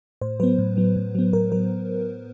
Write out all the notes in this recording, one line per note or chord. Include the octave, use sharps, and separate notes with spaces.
A2 C5
F#3 B3 B4
A2
F#3 B3
A2
F#3 B3
A2 A#4
F#3 A#4